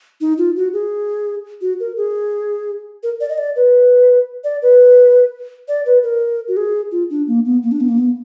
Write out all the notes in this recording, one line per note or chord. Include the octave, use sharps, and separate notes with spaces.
D#4
F4
F#4
G#4
F#4
A#4
G#4
A#4
D5
D#5
D5
B4
D5
B4
D5
B4
A#4
F#4
G#4
F4
D4
A#3
B3
A#3
D4
B3
A#3
B3